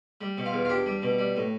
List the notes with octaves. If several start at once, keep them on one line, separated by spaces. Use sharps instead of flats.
G3
B2
F4
E2
F4
D4 G4
G3
B2
G3
A2